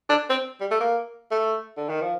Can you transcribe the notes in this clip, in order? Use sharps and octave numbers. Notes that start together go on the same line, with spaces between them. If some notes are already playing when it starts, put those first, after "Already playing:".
D4
C4
G3
A3
A#3
A3
D3
D#3
F3